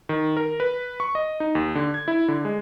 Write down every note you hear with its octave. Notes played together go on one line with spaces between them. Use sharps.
D#3
A#4
B4
C#6
D#5
D#4
D#2
D3
G#6
E4
D3
G#3